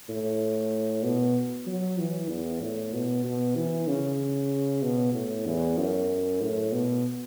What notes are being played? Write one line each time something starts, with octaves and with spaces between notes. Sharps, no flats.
A2
B2
F#3
E3
E2
A2
B2
B2
E3
C#3
B2
A2
E2
F#2
A2
B2